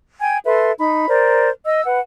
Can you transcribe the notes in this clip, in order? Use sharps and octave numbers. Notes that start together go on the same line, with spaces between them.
G5 G#5 G#6
A4 B4 E5 C6
D#4 B5
A#4 C5 D5
D#5 E6
B4 F#5